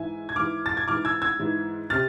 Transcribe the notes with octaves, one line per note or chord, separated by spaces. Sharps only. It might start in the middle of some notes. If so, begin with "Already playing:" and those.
Already playing: G#2 E3 E5 G#5
G#6
G#2 E3 D6 F6
A6
G#6
G#2 E3 D6 F6
E6 G#6
E6 G#6
G#2 E3
C3 F6 A6